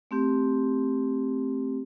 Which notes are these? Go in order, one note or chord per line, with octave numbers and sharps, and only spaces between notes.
A3 C4 G4